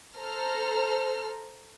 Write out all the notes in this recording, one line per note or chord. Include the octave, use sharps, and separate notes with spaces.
A4 C5 A#5 F6